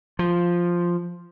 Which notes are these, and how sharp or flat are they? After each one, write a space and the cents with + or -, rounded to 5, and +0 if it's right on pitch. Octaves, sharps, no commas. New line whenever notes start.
F3 +0